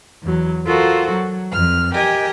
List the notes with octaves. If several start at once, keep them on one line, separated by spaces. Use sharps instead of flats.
E2 F#3
F4 F#4 A4 A#4 C5
F#3
F2 F6
G4 A#4 D#5 G5 G#5